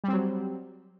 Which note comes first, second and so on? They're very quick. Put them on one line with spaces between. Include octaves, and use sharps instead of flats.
G3 C4 F#3